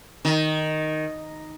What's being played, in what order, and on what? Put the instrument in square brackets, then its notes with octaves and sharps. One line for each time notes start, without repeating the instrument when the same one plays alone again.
[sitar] D#3